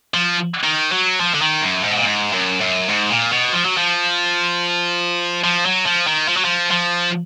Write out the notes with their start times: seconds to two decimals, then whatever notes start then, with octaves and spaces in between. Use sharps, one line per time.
0.14 F3
0.63 D#3
0.92 F#3
1.20 F3
1.34 D3
1.41 D#3
1.62 F#2
1.84 G#2
1.91 B2
1.98 A#2
2.05 G#2
2.33 F#2
2.62 F#2
2.90 G#2
3.10 A#2
3.32 B2
3.53 F3
3.65 F#3
3.78 F3
5.44 F3
5.66 F#3
5.86 F3
6.07 D#3
6.28 F3
6.37 F#3
6.45 F3
6.71 F3